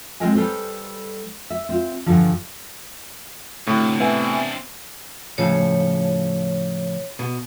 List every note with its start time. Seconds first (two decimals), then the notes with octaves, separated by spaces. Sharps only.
0.20 G#3 C4 F4 A#4 D#5 G#5
0.35 G3 A4 B4 C5
1.50 E5
1.69 C4 F4
2.06 E2 G2 D3 F3
3.67 D2 A2 C3
4.00 B3 C4 D4 E5 G#5
5.38 A2 C#3 F3 C#5
7.19 B2